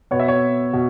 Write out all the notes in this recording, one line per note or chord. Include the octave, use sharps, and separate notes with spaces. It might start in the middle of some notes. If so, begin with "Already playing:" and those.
B2 B3 C#5
E5
C#5
B2